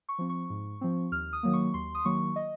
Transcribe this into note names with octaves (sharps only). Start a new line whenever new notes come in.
C#6
F3 C4
C#6
G#2
F3 C4
D#2 F6
D#6
D#3 F#3 A#3
C#6
D#2 C6
D#6
D#3 F#3 A#3 C#6
D#5